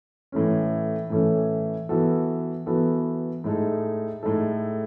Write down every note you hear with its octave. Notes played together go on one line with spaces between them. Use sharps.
A2 E3 A3 C#4
A2 E3 A3 C#4
E3 B3 F#4 A4
E3 B3 F#4 A4
A2 G#3 D#4 A4
A2 G#3 D#4 A4